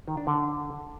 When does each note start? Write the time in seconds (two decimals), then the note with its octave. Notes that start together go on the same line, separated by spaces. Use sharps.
0.08 D#3
0.17 D4
0.27 D3